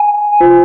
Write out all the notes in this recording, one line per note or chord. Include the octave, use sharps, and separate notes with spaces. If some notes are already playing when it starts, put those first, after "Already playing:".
Already playing: G#5
F4 C5